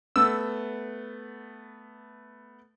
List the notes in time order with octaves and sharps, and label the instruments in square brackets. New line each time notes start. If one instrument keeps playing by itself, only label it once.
[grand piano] A3 B3 [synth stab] E6